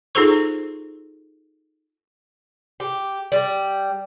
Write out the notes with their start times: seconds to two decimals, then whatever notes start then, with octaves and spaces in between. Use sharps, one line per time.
0.15 D#4 F4 G#4 A4 C5 C#6
2.80 G4
3.32 G3